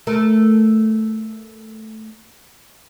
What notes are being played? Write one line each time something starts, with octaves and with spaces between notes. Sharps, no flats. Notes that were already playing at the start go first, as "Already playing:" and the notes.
A3 A#4